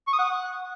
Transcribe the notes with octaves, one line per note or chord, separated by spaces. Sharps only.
C#6
D#6
F#5